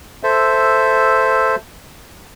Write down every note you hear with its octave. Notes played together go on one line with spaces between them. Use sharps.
A4 C5 E5